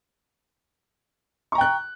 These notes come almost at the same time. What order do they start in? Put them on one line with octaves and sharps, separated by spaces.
C#6 A#5 G5 F#6